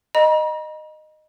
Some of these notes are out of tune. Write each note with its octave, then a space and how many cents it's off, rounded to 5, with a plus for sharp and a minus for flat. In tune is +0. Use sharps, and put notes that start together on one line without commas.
D#5 -15 A#5 +45